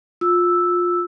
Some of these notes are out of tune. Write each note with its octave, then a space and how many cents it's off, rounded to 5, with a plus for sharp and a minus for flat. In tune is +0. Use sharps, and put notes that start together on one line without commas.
F4 +20 E6 +0